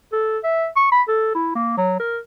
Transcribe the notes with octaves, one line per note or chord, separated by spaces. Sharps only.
A4
E5
C#6
B5
A4
E4
A#3
F#3
A#4